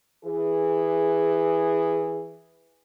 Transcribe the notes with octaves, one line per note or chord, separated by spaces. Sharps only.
E3 G#4